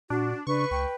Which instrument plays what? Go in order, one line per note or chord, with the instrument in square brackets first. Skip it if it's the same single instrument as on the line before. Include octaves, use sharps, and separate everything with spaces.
[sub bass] A#2 [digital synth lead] D4 [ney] F#4
[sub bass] C#3 [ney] D4 [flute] B4 [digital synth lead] C#6
[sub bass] C#2 [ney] G5